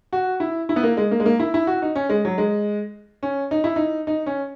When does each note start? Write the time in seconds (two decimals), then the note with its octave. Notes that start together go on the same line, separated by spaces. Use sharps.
0.13 F#4
0.40 E4
0.69 E4
0.76 B3
0.83 A#3
0.97 G#3
1.11 A#3
1.20 G#3
1.26 A#3
1.39 E4
1.54 E4
1.67 F#4
1.82 D#4
1.96 C#4
2.09 G#3
2.25 F#3
2.38 G#3
3.23 C#4
3.51 D#4
3.64 E4
3.76 D#4
4.07 D#4
4.26 C#4